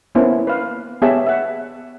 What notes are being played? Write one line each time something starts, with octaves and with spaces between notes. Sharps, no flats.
A#3 B3 C#4 E4 C5
B4 F5
B3 G4 G#4 C#5 E5 A5
E5 F#5